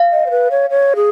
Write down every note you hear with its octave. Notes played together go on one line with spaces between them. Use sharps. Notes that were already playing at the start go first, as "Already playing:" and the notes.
Already playing: F5
D#5
C5
B4
C#5
C#5
G#4